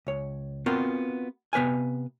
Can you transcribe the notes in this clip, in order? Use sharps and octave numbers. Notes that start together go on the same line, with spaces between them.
C#2 C#5
B3 C4 F4 F#4 A#4
C3 B3 B4 F5 G#5